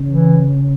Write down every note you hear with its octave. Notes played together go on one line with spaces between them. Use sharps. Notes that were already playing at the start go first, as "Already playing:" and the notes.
Already playing: C#3
E3